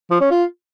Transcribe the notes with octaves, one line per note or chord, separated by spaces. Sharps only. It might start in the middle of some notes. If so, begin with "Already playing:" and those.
F3
C#4
F4